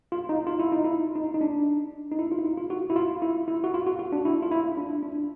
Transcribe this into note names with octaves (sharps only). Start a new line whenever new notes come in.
F4
D#4
F4
E4
D#4
E4
D#4
D#4
D4
D#4
E4
F4
E4
D#4
F4
F#4
E4
F4
E4
E4
F#4
F4
F#4
F#4
D4
E4
F4
E4
D4
D4